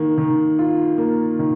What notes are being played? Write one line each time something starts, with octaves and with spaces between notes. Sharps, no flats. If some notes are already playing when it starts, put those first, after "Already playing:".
Already playing: D#3 A#3
D#3
F4
A#3
D#3